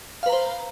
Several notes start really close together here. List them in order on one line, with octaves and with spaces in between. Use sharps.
F5 B4 A#5 C5